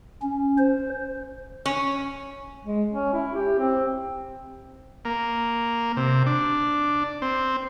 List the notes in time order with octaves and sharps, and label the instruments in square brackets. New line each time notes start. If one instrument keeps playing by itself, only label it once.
[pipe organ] C#4
C5
[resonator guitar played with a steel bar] C#4
[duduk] G#3
C#4
E4
G4
C4
[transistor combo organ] A#3
C3
D4
C4